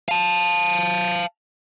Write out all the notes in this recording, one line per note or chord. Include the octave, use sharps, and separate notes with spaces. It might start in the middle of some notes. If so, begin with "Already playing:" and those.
F5 A5